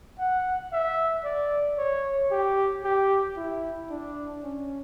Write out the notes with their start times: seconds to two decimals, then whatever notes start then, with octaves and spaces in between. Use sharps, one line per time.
0.19 F#5
0.72 E5
1.24 D5
1.78 C#5
2.31 G4
2.84 G4
3.37 E4
3.90 D4
4.43 C#4